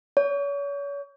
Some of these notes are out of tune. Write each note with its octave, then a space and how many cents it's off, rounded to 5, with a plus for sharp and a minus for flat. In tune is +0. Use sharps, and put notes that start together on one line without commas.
C#5 +35